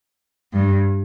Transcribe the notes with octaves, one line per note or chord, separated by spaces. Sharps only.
G2